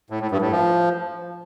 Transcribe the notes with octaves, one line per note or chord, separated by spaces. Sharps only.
A2
A2
G2
A2
F3